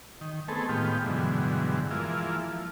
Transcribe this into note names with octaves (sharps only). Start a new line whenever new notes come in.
D#3
A3 B3 C4 G#4 A4
A2 D#3 G#3 B3 F4 G4
G2 B2 D3 E3 F#3 G#3
E3 F3 G#3 A#3 E4 F4
F3